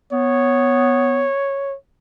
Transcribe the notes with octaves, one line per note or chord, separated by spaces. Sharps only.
B3 C#5